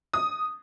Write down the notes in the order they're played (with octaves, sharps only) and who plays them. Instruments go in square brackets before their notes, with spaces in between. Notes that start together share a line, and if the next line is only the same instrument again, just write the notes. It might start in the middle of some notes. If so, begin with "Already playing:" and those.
[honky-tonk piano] D#6